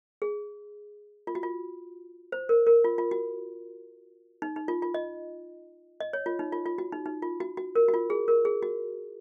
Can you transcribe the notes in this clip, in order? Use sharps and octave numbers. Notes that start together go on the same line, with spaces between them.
G#4
F4
F#4
F4
C5
A#4
A#4
F4
F4
F#4
D#4
D#4
F4
F4
D#5
D#5
C#5
F4
D#4
F4
F4
F#4
D#4
D#4
F4
F#4
F#4
A#4
F#4
F4
G#4
A#4
G#4
F#4